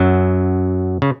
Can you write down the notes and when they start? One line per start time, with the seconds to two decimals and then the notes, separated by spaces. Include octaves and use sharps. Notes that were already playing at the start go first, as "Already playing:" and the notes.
Already playing: F#2 F#3
1.02 C#3